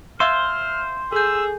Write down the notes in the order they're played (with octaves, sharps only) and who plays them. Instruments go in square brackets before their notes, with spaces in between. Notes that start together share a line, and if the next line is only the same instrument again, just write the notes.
[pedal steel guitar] C5 [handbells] E5 F5 E6 [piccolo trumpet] F6
[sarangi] G#4 [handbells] A4 G6 [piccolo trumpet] E6